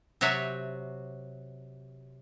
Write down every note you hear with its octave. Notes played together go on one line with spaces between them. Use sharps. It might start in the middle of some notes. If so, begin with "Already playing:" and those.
C3 F#3 F#4 C#5 E5